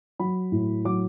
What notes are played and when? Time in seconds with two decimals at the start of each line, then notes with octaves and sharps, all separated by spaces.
0.19 F#3 B5
0.52 A2
0.85 F#3 D6